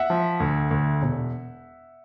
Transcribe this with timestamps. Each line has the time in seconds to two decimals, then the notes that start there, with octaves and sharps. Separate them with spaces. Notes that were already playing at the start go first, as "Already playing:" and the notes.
Already playing: E5 F#5
0.10 F3
0.40 D2
0.71 D2
1.02 E1